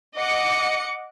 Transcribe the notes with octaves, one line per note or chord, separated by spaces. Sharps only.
D#5 F#5 D6 C#7